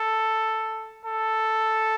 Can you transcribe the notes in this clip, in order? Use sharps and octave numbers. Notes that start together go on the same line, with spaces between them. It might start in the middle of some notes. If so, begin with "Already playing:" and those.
Already playing: A4
A4